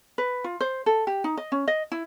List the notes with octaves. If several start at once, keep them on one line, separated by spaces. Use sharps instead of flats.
B4
F4
C5
A4
G4
D#4
D#5
C#4
D#5
E4